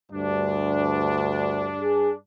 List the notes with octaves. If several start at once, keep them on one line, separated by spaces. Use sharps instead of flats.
D2 G2 D4
G#4